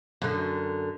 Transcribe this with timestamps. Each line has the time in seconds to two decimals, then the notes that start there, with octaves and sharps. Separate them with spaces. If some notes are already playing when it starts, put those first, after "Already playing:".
0.22 F#2 D3